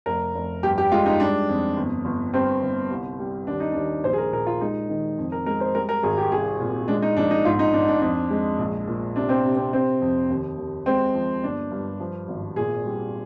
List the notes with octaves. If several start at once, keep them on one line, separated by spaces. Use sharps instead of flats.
F1 A#4
F1
G2 G4
G4
G#3 F4
D#4
G3 D4
F2
G1
G1
G2 C4
G1
C2
G3
D#2 D4
D#4
D#2 D4
A#1 C5
G#4
A#4
A#2 A#4
F4
G#3 D#4
D#3
F2
A#4
G#3 A#4
C5
G3 A#4
A#4
G#1 G#4
G4
C2 G#4
A#2
G#3 D4
D#4
A#1 D4
D#4
G#2 F4
D#4
G#2 D4
D4
F2 D4
G#3
A#1
A#2
C3 D4
C4
C3
C4
C3 C4
F2
D#2
D#2
G#3 C4
F3
G1 D4
G2
F3
G#1
A#2 G#4
G3